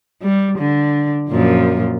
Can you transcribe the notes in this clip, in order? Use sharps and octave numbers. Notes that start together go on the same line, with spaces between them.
G3
D3
F#2 A#2 F3